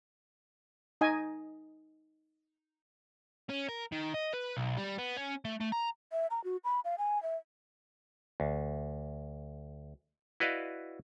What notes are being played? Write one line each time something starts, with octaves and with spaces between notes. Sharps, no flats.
D#4 D#5 G#5
C#4
A#4
D#3
D#5
B4
B1
G3
B3
C#4
A3
A3
A#5
E5
A#5
F#4
B5
F5
G#5
E5
D2
E4 F#4 B4 D5 D#5 F5